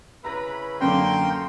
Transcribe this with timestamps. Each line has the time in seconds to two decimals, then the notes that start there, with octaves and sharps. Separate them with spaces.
0.25 C#3 E4 B4 A#5 A#6
0.81 F#2 D3 A#3 C#4 G5 C6